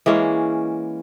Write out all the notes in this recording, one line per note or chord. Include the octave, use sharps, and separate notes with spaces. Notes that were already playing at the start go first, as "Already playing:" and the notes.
E3 G#3 A#3 C#4